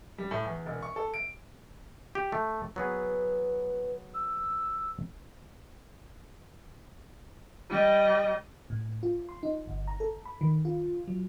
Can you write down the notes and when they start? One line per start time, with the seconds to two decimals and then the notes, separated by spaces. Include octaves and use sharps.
0.18 G3
0.31 A2
0.45 E2
0.66 E1
0.82 C#6
0.96 A4
1.14 D7
2.15 G4
2.32 A3
2.76 F#3 B3 G#4 B4
4.14 E6
7.69 G3 D#5
8.70 A2
9.03 F4
9.29 C6
9.43 D#4
9.67 G1
9.88 A#5
10.00 A4
10.25 B5
10.41 D#3
10.65 F4
11.07 F#3